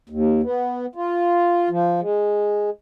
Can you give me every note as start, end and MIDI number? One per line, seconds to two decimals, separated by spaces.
0.10 0.41 39
0.43 0.86 59
0.95 1.69 65
1.70 2.00 53
2.01 2.70 56